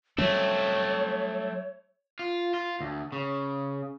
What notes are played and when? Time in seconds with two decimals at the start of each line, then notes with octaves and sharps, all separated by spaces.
0.18 F#3 G3 A3 C4 C#4 C#5
2.19 F4
2.54 F4
2.80 D2
3.12 C#3